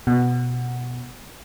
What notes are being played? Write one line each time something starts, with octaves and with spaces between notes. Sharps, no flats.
B2